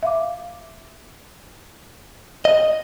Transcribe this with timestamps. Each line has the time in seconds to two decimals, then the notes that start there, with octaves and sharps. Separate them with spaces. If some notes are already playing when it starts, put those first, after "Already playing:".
0.03 E5 F5 D6
2.45 D#5